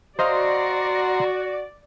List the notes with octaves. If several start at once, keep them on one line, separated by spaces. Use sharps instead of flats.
F#4 C5 D5 D#5 F5 A#5 C6